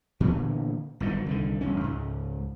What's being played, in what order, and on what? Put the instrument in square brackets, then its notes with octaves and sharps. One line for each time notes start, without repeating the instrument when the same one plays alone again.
[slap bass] A#2 D3 E3 B3
G1 G#2 D#3 F#3
C2 D3 D#3
E1 G2 C#4
C#2 G#2